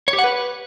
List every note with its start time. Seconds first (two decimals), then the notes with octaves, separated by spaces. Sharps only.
0.08 C#5
0.13 G4
0.19 F#5
0.24 B4